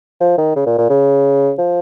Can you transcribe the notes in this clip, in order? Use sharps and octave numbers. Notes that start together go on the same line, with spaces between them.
F3
D#3
C#3
A#2
A#2
C#3
F3